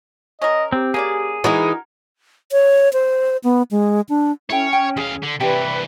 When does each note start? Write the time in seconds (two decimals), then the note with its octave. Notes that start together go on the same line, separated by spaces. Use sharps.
0.42 C#4 A#4 D#5
0.72 C4 G4
0.94 A#3 C#4 G#4 D5
1.44 E3 G#3 D#4 E4 F#4 A#4
2.52 C#5
2.93 C5
3.44 B3
3.71 G#3
4.09 D4
4.50 C#4 E4 A4 C#5 G5
4.73 G5
4.97 E2 G#4 F5
5.23 D3
5.40 C3 E3 G4 B4 D5 E5 A5